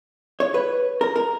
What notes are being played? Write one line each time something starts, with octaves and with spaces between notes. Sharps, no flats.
C#5
B4
A#4
A#4